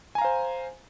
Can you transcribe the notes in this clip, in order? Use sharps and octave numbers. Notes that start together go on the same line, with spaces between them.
C5 F5 G#5 A#5